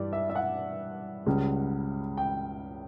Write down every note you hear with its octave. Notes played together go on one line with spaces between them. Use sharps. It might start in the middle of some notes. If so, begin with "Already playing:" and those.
Already playing: G2 E3 G3 D5
E5
E5
F#5
C#2 C#3 G3
G5